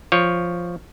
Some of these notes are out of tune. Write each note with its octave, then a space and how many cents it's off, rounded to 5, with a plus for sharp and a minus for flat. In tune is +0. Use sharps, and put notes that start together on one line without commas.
F3 +0 C#5 +0